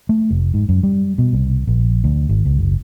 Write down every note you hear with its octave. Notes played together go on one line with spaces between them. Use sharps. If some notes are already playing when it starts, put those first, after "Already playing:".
A3
F1
G#2
F#2
G3
B2
C2
A#1
D2
G#1
C#2
F#1